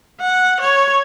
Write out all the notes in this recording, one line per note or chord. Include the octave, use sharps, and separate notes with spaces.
F#5
C#5